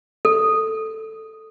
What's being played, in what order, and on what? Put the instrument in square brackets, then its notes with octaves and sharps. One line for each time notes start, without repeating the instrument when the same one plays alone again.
[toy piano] A4